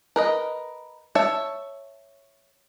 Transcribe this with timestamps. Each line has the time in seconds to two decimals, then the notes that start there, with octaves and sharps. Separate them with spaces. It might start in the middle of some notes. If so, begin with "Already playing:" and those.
0.16 A#4 B4 D#5
1.15 C#5 E5 A5